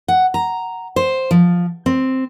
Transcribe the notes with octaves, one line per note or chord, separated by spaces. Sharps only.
F#5
A#5
C5
F3
C4